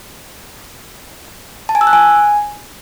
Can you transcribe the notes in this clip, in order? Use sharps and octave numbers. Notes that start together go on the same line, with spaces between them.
A5
G#5
E6
F#6
G#5